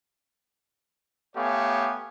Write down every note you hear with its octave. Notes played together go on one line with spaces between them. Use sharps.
A3 B3 G4 C#5 F5 G#5